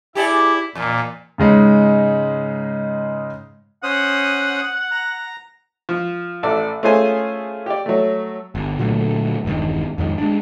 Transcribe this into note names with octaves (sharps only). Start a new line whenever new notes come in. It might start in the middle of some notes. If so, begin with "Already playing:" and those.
E4 G4 G#4 D5
E2 A#2
G#2 C#3 G#3 D#4
C#4 C5 F#5 D#6
A#5
F3
A1 A4 D5 E6
A3 C#4 F4 G#4 C5 G#5
G4 D5
F#3 A3
G1
A#2 D3 F#3 A3
E1 G2 D#3
F2 G#2 D#3
G#3 D4